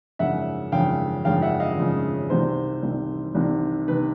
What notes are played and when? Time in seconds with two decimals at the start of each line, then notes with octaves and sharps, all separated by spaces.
0.19 G#1 F#2 C#3 F3 E5 F#5
0.72 G#1 F#2 C#3 F3 F5 G5
1.25 G#1 F#2 C#3 F3 F5 G5
1.42 E5 F#5
1.60 D#5 F5
1.77 G#1 F#2 C#3 F3
2.30 C2 C3 D#3 C5
2.83 C2 C3 D#3
3.35 C2 C3 D#3
3.88 C3 D#3 B4